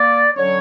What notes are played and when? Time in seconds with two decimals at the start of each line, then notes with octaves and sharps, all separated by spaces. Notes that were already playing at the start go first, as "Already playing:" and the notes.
Already playing: A#3 D5
0.36 D3 F#3 C#4 C#5